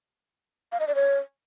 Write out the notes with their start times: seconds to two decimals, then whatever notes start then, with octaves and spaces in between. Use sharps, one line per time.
0.72 F5
0.80 D#5
0.87 D5
0.95 C#5